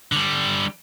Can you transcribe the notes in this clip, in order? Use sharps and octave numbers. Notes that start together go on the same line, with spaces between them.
D3 G3